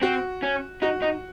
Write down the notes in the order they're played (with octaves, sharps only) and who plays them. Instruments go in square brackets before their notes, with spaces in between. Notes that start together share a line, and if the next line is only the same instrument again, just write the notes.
[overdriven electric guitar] C4 [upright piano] F#4
[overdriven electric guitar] C#4
[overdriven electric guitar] D#4 [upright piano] F#4
[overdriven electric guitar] D#4